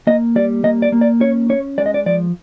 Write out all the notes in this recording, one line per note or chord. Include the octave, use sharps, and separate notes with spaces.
A#3 D#5
G3 D5
A#3 D#5
D5
A#3
D5
C#4 C#5
C#4 C#5
G#3 D5
D#5
D5
F3 D5